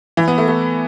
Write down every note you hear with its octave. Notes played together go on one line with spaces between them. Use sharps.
E3
B3
A3
A3